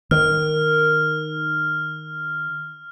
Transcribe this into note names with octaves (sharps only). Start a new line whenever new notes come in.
D#3 F6